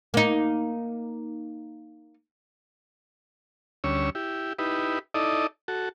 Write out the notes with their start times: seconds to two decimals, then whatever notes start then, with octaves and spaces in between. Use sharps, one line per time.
0.14 A#3 D#4
3.84 D2 G3 C#4 C#5 E6
4.15 E4 G4
4.59 D#4 E4 G4 B4
5.14 D#4 E4 A4 D5 D#5
5.68 F#4 A4